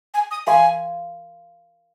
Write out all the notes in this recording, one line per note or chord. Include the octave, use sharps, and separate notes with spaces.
G#5
D#6
A#4 F5 G#5 C6